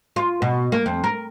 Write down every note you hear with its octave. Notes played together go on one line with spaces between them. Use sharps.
F4
B2
A#3
F2
A#4